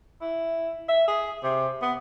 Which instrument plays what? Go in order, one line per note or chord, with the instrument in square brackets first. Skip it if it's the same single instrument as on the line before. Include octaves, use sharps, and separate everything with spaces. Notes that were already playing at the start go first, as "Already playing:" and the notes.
[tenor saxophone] E4
E5
G#4
C3
B3